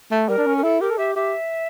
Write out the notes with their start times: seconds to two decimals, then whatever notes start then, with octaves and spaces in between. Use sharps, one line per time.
0.11 A3
0.28 G3 A#4
0.37 D4
0.46 C#4
0.58 A#4
0.63 E4 A4
0.81 G4 A#4
0.90 A4
0.98 G4 E5
1.16 G4 E5